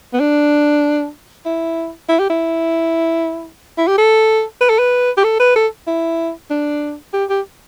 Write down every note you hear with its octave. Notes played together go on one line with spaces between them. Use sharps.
B3
D4
E4
E4
G4
E4
E4
G4
A4
B4
A4
B4
G4
A4
B4
A4
E4
D4
G4
G4